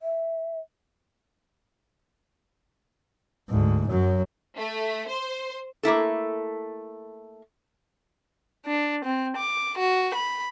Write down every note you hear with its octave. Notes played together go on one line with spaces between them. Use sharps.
E5
D2 G#2
F#2 F#3
A3
C5
A3 A#3 E4 A4
D4
C4
D6
F#4
B5